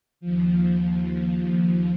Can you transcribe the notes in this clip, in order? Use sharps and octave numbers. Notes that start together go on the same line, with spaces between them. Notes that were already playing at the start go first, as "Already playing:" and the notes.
D#2 F3